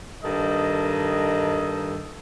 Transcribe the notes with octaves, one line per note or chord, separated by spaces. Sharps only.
G2 D#3 A4 D#5